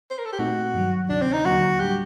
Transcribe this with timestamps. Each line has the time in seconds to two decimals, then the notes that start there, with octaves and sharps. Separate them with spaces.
0.10 C5
0.18 A#4
0.25 A4
0.32 G4
0.39 A#2 A3 C4 D#4 F#4
0.74 G2 D#3 F#3
1.09 D2 C3 D#3 D4
1.22 C4
1.33 D#4
1.45 D#2 D3 F#3 A#3 F#4
1.80 A2 G3 D4 G4